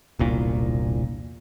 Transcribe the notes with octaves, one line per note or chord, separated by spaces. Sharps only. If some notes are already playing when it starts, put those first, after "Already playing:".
E1 C2 A#2